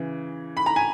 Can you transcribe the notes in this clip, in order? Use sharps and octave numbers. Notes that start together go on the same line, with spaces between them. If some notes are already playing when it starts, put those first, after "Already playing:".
Already playing: C#3 E3
B5
A#5
G#5